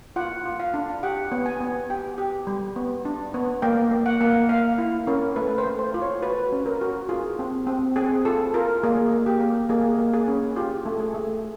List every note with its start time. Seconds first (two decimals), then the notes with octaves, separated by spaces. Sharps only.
0.16 F4 F#5
0.46 F4
0.60 F5
0.74 D4
1.03 G4 F#5
1.32 B3
1.46 G#5
1.60 B3
1.90 G4 G5
2.18 G4
2.47 G3
2.76 B3
3.05 D4
3.34 B3
3.62 A#3 G5
3.91 A#3
4.06 F#5
4.21 A#3
4.49 A#3 F5
4.78 E4
5.07 C#4 A#4
5.36 A3 B4
5.58 C5
5.65 A3
5.79 C5
5.94 F4
6.02 C#5
6.22 F#4 B4
6.30 C5
6.39 B4
6.52 C#4
6.66 A#4
6.81 F#4
7.09 F4 G#4
7.39 C4
7.67 C4
7.96 C4 G#4
8.25 F4 A4
8.54 F4 A#4
8.83 A#3 G#4
9.11 A#3
9.26 G4
9.40 A#3
9.69 A#3 G#4
9.99 A#3
10.14 G#4
10.28 C#4
10.56 F4 G4
10.86 A3
11.00 G#4
11.14 A3